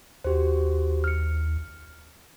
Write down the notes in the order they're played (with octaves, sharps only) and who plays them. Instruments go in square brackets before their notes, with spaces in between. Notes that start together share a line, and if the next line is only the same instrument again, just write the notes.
[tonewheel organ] D#2 [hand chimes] F#4 G4 C5
[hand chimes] F6 C#7